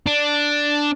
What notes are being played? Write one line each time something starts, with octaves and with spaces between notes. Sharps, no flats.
D4